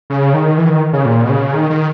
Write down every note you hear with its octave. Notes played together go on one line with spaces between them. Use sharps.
C#3
D#3
E3
D#3
C#3
A#2
B2
C#3
D#3
D#3